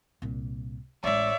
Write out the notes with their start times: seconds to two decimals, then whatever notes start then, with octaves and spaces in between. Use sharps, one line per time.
0.22 C2 A#2
1.04 A1 G#3 C#5 D5 E5